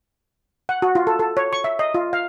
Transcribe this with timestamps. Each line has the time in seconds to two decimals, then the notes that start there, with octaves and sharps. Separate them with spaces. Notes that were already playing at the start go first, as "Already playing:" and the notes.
0.69 F#5
0.82 F#4
0.95 F4
1.07 A4
1.19 A4
1.37 C#5
1.53 C#6
1.64 E5
1.79 D#5
1.94 F4
2.13 F5